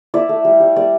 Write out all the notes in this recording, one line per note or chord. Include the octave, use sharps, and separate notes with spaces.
E4 D5
A3
G3
G3
G3 D5